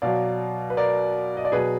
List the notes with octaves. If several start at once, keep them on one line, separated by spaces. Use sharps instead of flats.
B2 F#3 D5 F5
B4
A#4 D5
D#5
D5
B2 F#3 G#4 B4